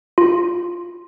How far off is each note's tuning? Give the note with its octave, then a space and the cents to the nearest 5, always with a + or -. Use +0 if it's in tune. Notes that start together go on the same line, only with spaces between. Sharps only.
F4 +0